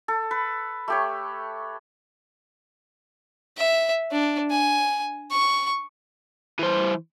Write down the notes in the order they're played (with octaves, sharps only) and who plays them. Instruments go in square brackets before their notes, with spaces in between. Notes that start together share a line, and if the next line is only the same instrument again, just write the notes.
[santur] A4
B4
A3 G4 C#5
[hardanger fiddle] E5
D4
G#5
C#6
[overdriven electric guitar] E3 C5